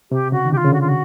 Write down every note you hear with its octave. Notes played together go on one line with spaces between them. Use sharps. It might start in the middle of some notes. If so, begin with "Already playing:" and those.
C3 G4
C#3 F#4
D#3
D3 F4 G4
C#3
D3 F#4
F4
F#4